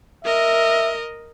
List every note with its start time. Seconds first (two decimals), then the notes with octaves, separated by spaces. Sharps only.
0.25 A#4 D#5 E5